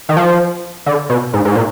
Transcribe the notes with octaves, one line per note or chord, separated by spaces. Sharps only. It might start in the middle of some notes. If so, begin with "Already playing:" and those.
D#3
F3
D3
B2
G#2
G#2
A#2